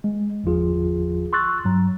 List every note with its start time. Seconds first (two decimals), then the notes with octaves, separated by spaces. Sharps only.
0.04 G#3
0.44 G1 E2 F3 F4 G#4
1.33 C6 C#6 E6 F#6 A6
1.65 G2 F#3 A#5